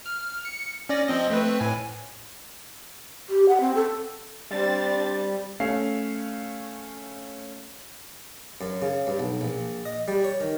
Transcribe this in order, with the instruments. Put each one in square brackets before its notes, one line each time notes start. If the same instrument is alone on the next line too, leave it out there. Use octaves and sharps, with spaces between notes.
[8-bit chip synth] F6
C#7
C#4 D5 A#6
F3 C4 D#5
A3 C4 B4
A2 G#5
[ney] G4
F#5
C4
A4
[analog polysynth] G3 [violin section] C4 D4 A6
[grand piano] A3 C#4 F5 C7
[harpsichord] F#2
C#3
G2
B1
A#1
D#5
G3
C#5
D#3